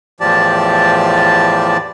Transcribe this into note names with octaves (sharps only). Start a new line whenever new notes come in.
E2 A2 F3 G4 D5 A5